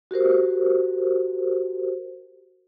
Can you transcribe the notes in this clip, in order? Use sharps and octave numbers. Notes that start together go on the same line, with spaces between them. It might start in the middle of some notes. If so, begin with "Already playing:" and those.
F#4 G4 A#4 C5